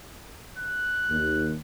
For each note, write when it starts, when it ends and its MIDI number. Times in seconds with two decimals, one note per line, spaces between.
0.58 1.54 90
1.10 1.57 39